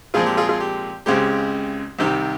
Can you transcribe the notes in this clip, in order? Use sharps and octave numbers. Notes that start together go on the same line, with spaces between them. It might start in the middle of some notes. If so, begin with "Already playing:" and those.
A#2 F3 G#3 C4 F4 G#4
G4
F4 G#4
F4 G#4
G4
C#2 C#3 G#3 C4 G4
C2 C3 D#3 G4